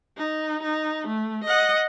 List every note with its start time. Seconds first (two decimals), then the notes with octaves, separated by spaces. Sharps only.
0.17 D#4
0.63 D#4
1.07 A3
1.44 D#5 F#5